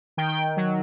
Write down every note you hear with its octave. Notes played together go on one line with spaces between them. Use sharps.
D#3 G5
F#3